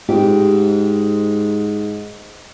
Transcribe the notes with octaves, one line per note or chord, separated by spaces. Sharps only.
G#2 G4